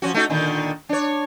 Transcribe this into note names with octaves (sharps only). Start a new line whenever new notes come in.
F3 C#4 F#4
A3 D#4 F#4
A#2 D3 D#3
D4 C#5